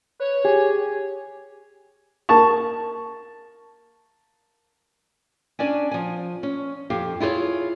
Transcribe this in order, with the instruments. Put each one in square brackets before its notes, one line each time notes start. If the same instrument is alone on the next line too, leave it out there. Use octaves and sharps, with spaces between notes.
[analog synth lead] B4 [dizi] C#5
[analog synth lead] G4 [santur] G#4
[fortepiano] A#3 A5 C#6
[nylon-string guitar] C#4 D4 D5 G#5
F3 G#5
C#4
F2 G4 F5
E4 F4 G#4 C5 C#5